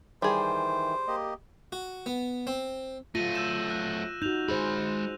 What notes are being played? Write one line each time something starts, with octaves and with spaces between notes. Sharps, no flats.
D#3 E3 G3 G#4 C5
A#3 G4 D#5
F#4
B3
C4
F#3 A3 F4 A#6 D#7
E6 G6 E7
F#6
D#4 F#4 G6 F7
G#3 G#4 C5 B5